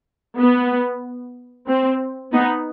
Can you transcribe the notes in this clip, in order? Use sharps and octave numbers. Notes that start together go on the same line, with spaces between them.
B3
C4
B3 D#4